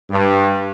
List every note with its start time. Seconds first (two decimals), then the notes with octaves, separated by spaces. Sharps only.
0.11 G2